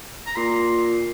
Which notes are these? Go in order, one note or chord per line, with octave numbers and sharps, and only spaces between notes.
A#5
A#2 C6